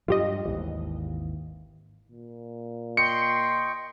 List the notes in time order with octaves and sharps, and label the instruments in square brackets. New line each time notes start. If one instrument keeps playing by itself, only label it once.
[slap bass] G2 F#3 [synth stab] F4 G4 D#5
[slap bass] G#1 D#2 E3
[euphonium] A#2
[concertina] D#5 G5 C#6 [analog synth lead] C6 [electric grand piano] C#7